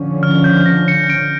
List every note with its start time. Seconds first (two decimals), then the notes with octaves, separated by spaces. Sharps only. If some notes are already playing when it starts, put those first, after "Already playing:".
Already playing: D3 F3 C#4
0.23 F6
0.44 G6
0.66 A#6
0.88 C#7
1.10 D7